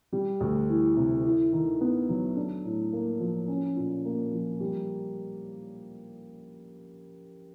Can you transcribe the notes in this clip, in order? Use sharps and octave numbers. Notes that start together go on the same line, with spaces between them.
G3
D2
E3
C3
E4
D#3
B3
F#3
D4
A2
A#3
F3
C#4
A#2
A#3
F3
G3